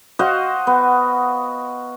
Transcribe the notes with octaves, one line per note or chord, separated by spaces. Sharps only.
F#4 C5 D#5 F5
B3